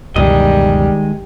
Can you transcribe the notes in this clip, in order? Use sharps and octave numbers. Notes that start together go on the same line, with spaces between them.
C#2 F#2 B2 D#3 E3 G3 G#3 D#5